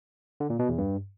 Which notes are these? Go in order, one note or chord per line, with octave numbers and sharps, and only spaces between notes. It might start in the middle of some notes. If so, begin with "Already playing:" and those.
D3
A#2
B2
E2
G2